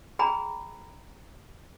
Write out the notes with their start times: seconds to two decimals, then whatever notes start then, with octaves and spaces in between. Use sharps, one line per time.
0.19 G#4 G5 A#5 B5